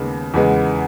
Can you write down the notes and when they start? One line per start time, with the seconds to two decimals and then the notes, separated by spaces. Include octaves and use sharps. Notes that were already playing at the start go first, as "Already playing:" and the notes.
Already playing: D#2 C#3 G#3 B3
0.34 E2 C#3 G#3 B3